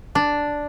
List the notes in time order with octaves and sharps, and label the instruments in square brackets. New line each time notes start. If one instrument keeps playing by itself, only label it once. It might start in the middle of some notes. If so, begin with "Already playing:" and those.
[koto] D4